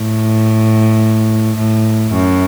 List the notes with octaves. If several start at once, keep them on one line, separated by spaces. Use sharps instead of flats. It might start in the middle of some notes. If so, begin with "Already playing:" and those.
Already playing: A2
A2
F#2